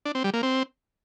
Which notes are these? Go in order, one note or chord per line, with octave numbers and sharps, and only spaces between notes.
D4
C4
G3
A#3
C4